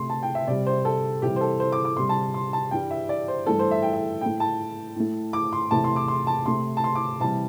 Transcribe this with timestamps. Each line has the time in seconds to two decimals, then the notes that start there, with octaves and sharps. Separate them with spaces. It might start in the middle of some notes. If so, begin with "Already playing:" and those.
Already playing: C3 A3 C6
0.10 A5
0.23 G5
0.35 E5
0.47 C3 G3 D5
0.67 C5
0.85 A4
1.22 C3 E3 G3 G4
1.36 C5
1.41 A4
1.60 C5
1.72 D6
1.85 D6
1.97 C3 G3 C6
2.09 A5
2.34 C6
2.53 A5
2.71 G2 E3 G3 G5
2.91 E5
3.09 D5
3.28 C5
3.46 G2 E3 A3 A4
3.59 C5
3.71 E5
3.82 G5
3.93 E5
4.21 A2 A3 G5
4.40 A5
4.96 A2 A3
5.33 D6
5.53 C6
5.71 E2 C3 A3 A5
5.84 C6
5.96 D6
6.08 C6
6.27 A5
6.46 C3 A3 C6
6.77 A5
6.84 C6
6.95 D6
7.20 C3 E3 G3 A5